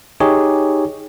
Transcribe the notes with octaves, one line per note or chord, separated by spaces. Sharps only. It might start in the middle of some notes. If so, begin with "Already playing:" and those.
D#4 G4 G#4 C#5